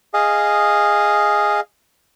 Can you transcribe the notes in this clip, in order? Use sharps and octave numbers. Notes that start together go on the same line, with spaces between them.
G#4 D#5 F5